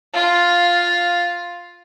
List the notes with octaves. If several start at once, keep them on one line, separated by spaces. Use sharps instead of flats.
F4 F5